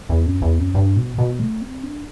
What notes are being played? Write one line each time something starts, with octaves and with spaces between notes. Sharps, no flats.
E2
F#2
E2
F#2
G2
B2
B2
A3
C4
D4